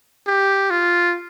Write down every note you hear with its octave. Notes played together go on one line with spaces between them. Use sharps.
G4
F4